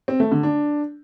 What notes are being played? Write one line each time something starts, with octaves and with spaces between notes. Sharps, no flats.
C4
A3
D3
D4